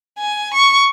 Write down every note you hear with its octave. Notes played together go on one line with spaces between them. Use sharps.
G#5
C#6